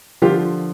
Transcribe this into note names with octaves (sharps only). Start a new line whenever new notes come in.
D3 F3 F4 G4